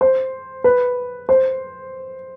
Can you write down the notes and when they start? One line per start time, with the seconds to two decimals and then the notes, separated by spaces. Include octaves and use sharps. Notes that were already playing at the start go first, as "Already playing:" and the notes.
0.01 C5
0.64 B4
1.29 C5